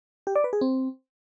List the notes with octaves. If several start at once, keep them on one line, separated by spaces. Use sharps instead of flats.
G4
D5
B4
G#4
C4